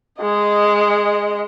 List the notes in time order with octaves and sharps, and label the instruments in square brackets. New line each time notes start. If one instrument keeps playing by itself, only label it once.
[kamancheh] G#3 D#5